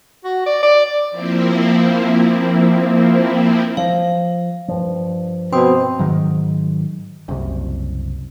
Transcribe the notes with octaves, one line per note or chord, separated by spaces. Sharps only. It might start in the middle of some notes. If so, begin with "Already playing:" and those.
F#4
D5
D5
F3 A#3 C4 E4
F3 F5
G2 F3
B2 C4 C6 D#6
G#2 D#3 F#3
F#1 C2